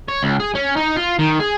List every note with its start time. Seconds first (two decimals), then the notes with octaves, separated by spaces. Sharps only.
0.09 C#5
0.23 C#2
0.40 G#4
0.55 C#4
0.76 D#4
0.96 F4
1.19 D#3
1.40 G#4